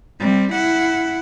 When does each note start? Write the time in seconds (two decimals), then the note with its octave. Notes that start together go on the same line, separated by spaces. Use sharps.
0.20 G3 C4
0.53 E4 F#5